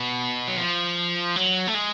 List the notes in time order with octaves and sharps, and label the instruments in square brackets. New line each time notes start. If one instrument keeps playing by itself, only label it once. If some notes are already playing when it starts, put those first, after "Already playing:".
Already playing: [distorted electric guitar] B2
F#3
F3
F#3
A3
G#3